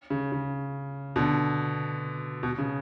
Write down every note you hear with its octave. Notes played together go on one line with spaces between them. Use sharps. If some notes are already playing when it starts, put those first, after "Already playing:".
C#3
C#3
B2 D3
B2
C#3